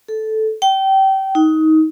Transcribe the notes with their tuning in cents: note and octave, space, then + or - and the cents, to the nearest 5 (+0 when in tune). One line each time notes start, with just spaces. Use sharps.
A4 -10
G5 -25
D#4 +20